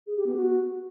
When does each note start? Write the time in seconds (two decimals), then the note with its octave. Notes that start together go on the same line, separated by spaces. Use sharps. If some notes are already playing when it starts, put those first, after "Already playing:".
0.07 G#4
0.17 G4
0.26 B3
0.36 F#4